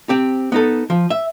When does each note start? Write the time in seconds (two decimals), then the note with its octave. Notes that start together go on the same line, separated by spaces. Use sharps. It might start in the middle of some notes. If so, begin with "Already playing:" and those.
0.09 C4 G4
0.52 B3 D#4 A4
0.90 F3
1.10 E5